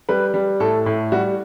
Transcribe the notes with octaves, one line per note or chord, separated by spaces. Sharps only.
G3 B4
G3
A2 A4
A2
G3 F#4